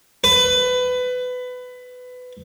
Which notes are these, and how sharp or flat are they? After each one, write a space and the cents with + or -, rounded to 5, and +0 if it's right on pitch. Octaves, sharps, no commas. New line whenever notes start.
B4 +20